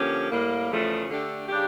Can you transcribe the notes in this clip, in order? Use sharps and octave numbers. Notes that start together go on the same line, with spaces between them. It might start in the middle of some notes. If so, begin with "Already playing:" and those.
Already playing: D3 F3 A#3 C#4 G4
A2 G3 A#3
E2 C#3 F3 A3
D3 A3 D4 G4
C#3 G3 D4 G4